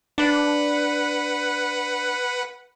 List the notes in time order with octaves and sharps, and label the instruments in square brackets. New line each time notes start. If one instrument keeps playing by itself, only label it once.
[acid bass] D4 [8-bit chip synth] B4 F#5